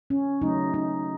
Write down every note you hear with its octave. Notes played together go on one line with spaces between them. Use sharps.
C#4
C#3 F#3 A3 D#4
D#4